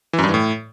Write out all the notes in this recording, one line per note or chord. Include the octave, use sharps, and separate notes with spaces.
E3
F#2
G2
E3
A2